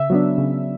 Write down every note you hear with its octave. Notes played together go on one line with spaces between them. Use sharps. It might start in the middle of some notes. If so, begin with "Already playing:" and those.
Already playing: C#3 E5
F#3 B3 D4
C#3